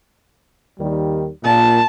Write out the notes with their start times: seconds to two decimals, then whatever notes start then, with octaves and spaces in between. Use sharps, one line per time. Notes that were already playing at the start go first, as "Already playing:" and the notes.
0.79 D#2 D#3 G3
1.44 A#2 A5